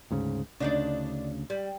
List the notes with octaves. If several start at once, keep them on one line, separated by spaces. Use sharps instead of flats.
D2 G#2 C#3
D2 C#3 D4 D#4 D5
G3